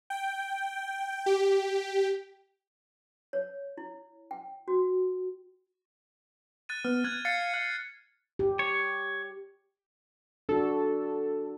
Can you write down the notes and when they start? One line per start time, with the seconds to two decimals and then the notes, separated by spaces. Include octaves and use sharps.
0.10 G5
1.26 G4
3.33 C#5
3.77 E4
4.31 G5
4.68 F#4
6.69 F#6 A6 D#7
6.85 B3 F6
7.04 F#6 G#6
7.25 F5 A6 C7 C#7
7.54 F#6
8.39 G4
8.59 C#5
10.49 D4 F#4 A4